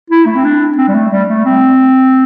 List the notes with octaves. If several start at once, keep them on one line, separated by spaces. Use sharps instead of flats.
E4
A3
C4
D4
C4
G3
A3
G3
A3
C4